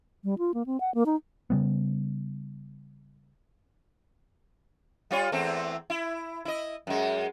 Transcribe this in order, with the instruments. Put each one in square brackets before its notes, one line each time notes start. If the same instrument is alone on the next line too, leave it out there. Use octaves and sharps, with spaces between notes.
[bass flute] G3
F4
A#3
C4
F#5
A#3
D#4
[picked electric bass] C#3 G3 B3
[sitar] G3 F4 C#5
E2 A3 C4
E4
E4 D#5
F#2 G#3